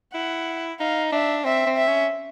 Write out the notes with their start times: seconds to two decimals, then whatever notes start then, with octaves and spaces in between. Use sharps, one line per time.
0.14 E4 F#5
0.80 D#4 F5
1.12 D4 E5
1.44 C4 E5
1.66 C4
1.77 E5
1.87 C#4